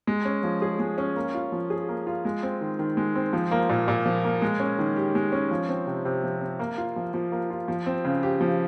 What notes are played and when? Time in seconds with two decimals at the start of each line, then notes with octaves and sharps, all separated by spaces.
0.07 G#3
0.25 C#4
0.43 F3
0.62 G#4
0.79 G#3
0.98 C#4
1.16 A#3
1.34 F4
1.52 F3
1.70 G#4
1.89 A#3
2.07 F4
2.25 G#3
2.43 C4
2.61 D#3
2.79 D#3
2.97 G#3
3.16 C4
3.33 F3
3.51 A#3
3.69 A#2
3.88 A#2
4.05 F3
4.25 A#3
4.42 G#3
4.60 C#4
4.79 D#3
4.96 G4
5.15 G#3
5.32 C#4
5.51 F3
5.69 C4
5.87 C3
6.05 C3
6.23 F3
6.41 C4
6.59 A#3
6.78 F4
6.96 F3
7.14 F3
7.32 A#3
7.50 F4
7.68 F3
7.86 C4
8.05 C#3
8.23 G4
8.41 F3